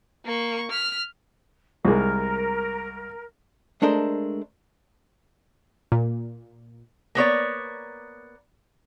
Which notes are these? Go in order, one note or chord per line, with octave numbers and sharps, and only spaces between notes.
A#3 C#6
F6 B6
C2 G#3 A#4
G#3 A3 D4 A#4 C5
A#2
A#3 B3 C#5 D5